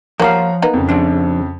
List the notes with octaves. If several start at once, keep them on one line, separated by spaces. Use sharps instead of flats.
F3 G3 A#3 C#5 F5 F#5 A#5
A#3 B3 D#4
F2 C#3
F3 D4